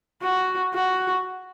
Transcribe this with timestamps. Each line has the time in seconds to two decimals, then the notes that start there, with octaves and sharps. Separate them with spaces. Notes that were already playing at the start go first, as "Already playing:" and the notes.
0.22 F#4
0.74 F#4